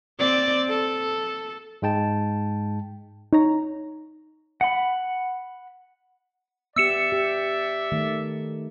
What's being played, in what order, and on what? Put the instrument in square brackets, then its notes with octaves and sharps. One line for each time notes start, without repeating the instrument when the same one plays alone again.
[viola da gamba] C4 D5
A4
[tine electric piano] G#2 G#3 G5 A5
[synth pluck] D#4 C#5 A#5
[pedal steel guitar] F#5 B5
[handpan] B3 G4 [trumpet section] D5 E5 [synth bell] E6 C#7 E7
[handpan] G4
D#3 A3